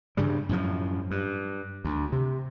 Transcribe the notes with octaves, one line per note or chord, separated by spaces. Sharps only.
G2 C#3 G3
F#2 A2 F3
G2
D2
C3